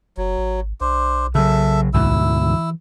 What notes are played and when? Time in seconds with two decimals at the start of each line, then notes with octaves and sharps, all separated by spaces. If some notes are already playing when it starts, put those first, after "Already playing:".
0.17 F#1 F#3
0.38 G#1
0.81 B1 D4 C5
1.35 C#3 F#3 A4 E5
1.94 D2 G#2 B2 E4 E6
2.48 E3